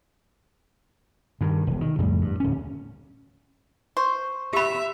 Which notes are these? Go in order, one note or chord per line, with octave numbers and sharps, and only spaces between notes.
G2 D#3
E1
D#3
F2 A2 C#3 G3
G2
D1 C#4
C5 C#6
G4 E5 B5